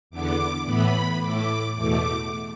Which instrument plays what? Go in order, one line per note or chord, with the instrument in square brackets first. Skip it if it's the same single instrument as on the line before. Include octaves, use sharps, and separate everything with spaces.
[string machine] E2 D3 B3 D6
A2 E3 B3 B5
A2 A3 D6
E2 B2 A3 D6